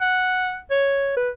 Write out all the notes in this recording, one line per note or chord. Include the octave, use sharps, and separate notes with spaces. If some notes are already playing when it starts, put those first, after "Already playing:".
F#5
C#5
B4